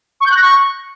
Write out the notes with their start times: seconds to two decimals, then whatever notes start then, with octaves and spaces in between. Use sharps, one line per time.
0.20 C#6
0.26 G6
0.31 F#6
0.36 A#6
0.41 C#6